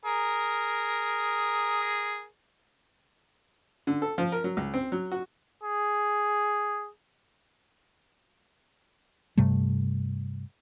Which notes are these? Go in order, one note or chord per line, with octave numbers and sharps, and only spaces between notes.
G#4 A#4
D3
A4
F3
A#4
F#3
C#2
C4
F#3
F#4
G#4
G2 C3 G3 A3